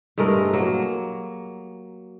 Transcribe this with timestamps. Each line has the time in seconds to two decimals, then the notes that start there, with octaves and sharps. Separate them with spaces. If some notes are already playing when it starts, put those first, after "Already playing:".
0.18 G2 G#3 A3 A#4
0.53 F#3 A#3